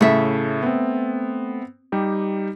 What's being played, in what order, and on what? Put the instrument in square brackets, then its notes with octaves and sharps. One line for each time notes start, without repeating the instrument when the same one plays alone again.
[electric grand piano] A2 C#3 [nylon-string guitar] A3 E5
[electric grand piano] B3 C4
G3 D#4 G4